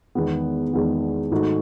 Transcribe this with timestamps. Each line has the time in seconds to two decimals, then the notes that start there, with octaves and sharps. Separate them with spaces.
0.15 E2 D#3 G#3 B3
0.73 E2 D#3 G#3 B3
1.31 G#2 D#3 A3 D#4 F#4